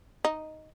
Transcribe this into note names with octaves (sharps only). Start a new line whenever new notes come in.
D#4